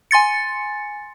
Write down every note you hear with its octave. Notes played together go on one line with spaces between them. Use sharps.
G#5 C6 A6 C#7